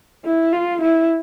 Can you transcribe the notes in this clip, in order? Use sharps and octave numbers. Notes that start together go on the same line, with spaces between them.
E4
F4
E4